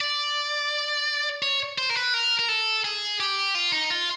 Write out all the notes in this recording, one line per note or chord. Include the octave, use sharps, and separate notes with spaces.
D5
C#5
C5
A#4
B4
A#4
A#4
A4
G#4
G4
F4
D#4
F4